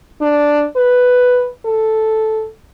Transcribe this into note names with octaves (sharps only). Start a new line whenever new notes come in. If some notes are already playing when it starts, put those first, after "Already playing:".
D4
B4
A4